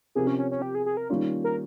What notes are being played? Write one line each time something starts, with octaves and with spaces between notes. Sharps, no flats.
C3 F3 C4 G4 G#4 A#4
C#4
C#4
C#4
G4
G#4
G#4
A#4
D#3 G3 A#3 C#4 F4
A#4